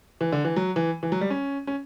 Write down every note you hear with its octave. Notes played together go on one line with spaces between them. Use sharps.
E3
D3
E3
F#3
E3
E3
F#3
G3
C#4
C#4